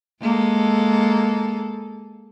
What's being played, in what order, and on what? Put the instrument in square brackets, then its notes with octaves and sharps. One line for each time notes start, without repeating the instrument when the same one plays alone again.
[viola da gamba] G#3 A#3 A4